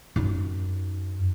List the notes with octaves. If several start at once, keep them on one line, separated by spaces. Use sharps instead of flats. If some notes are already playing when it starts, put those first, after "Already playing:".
F#2 D#4